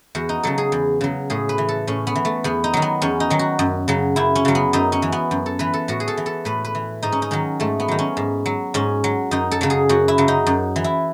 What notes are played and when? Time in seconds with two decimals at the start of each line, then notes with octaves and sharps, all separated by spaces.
0.15 E2 F#4
0.29 D#4
0.43 C#3 F#3 A4
0.58 G#4
0.72 E2
1.01 C#3 F#3
1.30 A2 G#4
1.49 B4
1.58 E3
1.69 A4
1.87 A2 C#4
2.07 B3
2.15 E3
2.25 A3
2.44 E2 B3
2.64 D#4
2.73 D#3 F#3
2.82 B3
3.02 E2 C#4
3.20 D#4
3.30 D#3 F#3
3.39 F#4
3.59 F#2
3.88 C#3 F#3
4.16 F#2 E4
4.35 C#4
4.45 C#3 F#3
4.55 B3
4.73 F#2 D#4
4.92 C#4
5.02 E3
5.12 B3
5.31 F#2
5.46 A4
5.59 E3 B4
5.74 A4
5.88 A2 F#4
6.00 G#4
6.08 A4
6.17 E3
6.26 A4
6.45 A2 B4
6.65 B4
6.75 E3
7.03 G#2 D#4
7.12 C#4
7.22 D#4
7.31 D#3 F#3 C#4
7.60 G#2 A3
7.80 B3
7.88 D#3 F#3
7.99 C#4
8.17 G#2
8.46 F#3
8.74 G#2 C#4
9.04 F#3
9.31 F#2 D#4
9.51 A4
9.61 C#3 F#3
9.70 G#4
9.89 F#2 F#4
10.08 E4
10.18 C#3 F#3
10.28 D#4
10.47 F#2
10.76 E3
10.84 E4